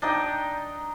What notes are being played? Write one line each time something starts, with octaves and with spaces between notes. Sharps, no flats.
D4 D#4 D#5 G5